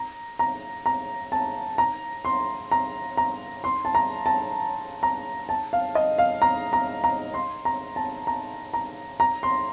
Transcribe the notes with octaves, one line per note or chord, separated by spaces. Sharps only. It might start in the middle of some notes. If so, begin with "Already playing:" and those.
Already playing: A#5
A#5
A#5
A5
A#5
C6
A#5
A#5
C6
A5
A#5
A5
A#5
A5
F5
D#5
F5
A#5
A#5
A#5
C6
A#5
A5
A#5
A#5
A#5
C6